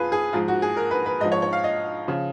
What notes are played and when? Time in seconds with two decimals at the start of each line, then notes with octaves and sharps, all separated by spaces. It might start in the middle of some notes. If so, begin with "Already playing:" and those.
Already playing: F2 F4 G#4 B4
0.12 G#4
0.33 G#2 F3 F4
0.48 F#4
0.62 G#4
0.77 A#4
0.91 B4
1.06 B4
1.20 G#2 D#5
1.24 F3
1.32 C#5
1.42 C#5
1.53 F5
1.64 D#5
2.08 C#3 F3